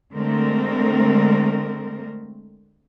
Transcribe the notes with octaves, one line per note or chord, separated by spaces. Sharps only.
D3 G#3 A3 C4 A#4